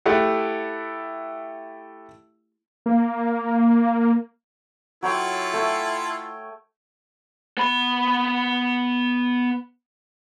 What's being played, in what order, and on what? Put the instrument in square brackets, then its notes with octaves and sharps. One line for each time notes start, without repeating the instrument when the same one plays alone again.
[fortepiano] A3 E4 G4 F#5
[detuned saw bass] A#3
[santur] F#3 C#5 G5 [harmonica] E4 F4 A4
[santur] A3 G5 G#5
[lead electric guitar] B3 B5